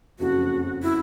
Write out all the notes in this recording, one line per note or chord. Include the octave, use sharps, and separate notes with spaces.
F#1 F2 C#3 F#4
E4